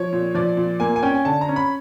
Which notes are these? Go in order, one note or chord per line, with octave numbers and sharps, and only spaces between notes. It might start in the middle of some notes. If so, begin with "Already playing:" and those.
Already playing: F3 C#5
A#2
F3 D5
A#2
A#3 G#5
G#5
C#4 G5
G#5
D3 A5
A#5
C#4
B5